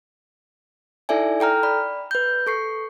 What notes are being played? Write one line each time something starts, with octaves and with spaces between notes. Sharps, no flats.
D#4 E4 A4 D5 E5 G#5
A4 G5 A#5 F6
D5 B5
B4 G6
A4 C#6 C7